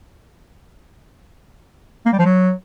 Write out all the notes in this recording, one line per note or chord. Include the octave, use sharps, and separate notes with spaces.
A#3
G3
F3
F#3